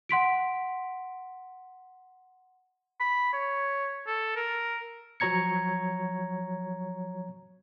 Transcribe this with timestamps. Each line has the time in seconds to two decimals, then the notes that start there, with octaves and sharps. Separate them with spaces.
0.09 F#5 C6 B6 D7
3.00 B5
3.33 C#5
4.07 A4
4.36 A#4
5.20 F3 F#3 C#5 A#5 G#6 C#7